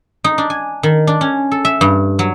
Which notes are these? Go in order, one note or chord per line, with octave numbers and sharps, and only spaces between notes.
D#4
D4
G#5
D#3
D4
C#4
A4
E5
G2
F#3